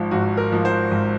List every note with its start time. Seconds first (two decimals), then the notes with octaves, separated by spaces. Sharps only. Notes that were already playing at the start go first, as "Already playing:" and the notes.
Already playing: G#1 G#2 F3
0.11 G#1 F#4
0.37 A#4
0.52 G#2 F3
0.65 C5
0.91 G#1